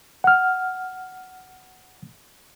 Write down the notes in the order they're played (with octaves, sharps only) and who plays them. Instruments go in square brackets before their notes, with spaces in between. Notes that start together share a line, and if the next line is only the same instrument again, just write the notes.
[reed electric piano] F#5 F6